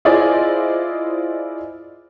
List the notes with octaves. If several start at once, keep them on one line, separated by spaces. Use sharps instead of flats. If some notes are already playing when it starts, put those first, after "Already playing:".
E4 F4 G#4 C5 D5 D#5